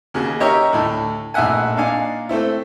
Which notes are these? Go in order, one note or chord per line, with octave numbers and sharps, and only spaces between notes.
D#2 C#3 F#4
D#4 G4 A#4 C#5 D#5 E5
D2 A2
A#1 A2 D#4 E5 F#5 G#5
A#2 D4 D#4 F5 G#5
A3 C4 E4